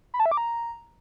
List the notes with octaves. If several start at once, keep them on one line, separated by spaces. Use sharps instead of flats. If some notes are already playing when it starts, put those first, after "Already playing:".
B5
A5
E5
D6
A#5